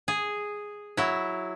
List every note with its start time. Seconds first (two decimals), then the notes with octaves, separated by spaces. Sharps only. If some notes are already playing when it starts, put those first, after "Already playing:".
0.08 G#4
0.97 F#3 E4